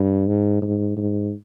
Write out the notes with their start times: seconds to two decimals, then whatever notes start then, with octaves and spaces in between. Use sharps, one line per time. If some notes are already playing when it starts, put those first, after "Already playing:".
Already playing: G2
0.27 G#2
0.62 G#2
0.97 G#2